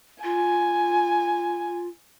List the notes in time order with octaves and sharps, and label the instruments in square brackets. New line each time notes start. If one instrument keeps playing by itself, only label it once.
[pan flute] F4 [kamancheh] G#5